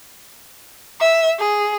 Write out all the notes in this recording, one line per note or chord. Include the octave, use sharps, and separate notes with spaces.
E5
G#4